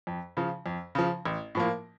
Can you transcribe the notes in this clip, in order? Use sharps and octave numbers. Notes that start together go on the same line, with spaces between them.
F2
C#3 F3
F2
C#3 F3
A1
A2 F3 A#3